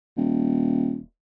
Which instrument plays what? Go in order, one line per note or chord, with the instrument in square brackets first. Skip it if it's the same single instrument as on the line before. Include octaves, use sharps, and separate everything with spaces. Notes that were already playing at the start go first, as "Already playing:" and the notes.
[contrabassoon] D#1